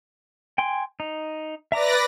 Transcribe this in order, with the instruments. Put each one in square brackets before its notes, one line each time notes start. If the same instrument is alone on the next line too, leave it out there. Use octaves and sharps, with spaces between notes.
[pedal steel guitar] G5 G#5 C6
D#4
[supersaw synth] B4 D5 A#6 [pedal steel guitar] E5 A#5 D6